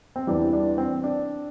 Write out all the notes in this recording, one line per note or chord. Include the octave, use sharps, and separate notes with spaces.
C4
E2 E3 G3 D4
D4
C4
D4